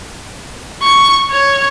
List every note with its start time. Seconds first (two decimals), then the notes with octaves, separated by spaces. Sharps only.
0.82 C#6
1.31 C#5